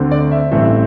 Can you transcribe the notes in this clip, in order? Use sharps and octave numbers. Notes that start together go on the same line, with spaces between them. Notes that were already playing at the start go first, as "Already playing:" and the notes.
Already playing: D2 D3 A3 C4
D5
E5
A1 G2 E3 A3 C4